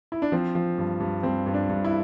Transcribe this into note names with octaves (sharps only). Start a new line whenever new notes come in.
E4
D4
F3 C4
F3
G2
G2
G2 C4
G2
D4
G2
E4